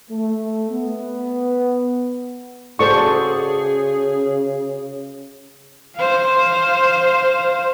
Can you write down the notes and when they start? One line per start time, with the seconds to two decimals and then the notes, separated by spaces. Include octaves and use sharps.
0.10 A3
0.71 B3
2.79 C#3 F#4 G#4 A4 C5 D5 C#6
5.96 C5 F5